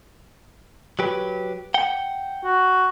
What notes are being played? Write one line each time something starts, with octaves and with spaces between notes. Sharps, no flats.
F#3 G4 B4
F#5 G5
F#4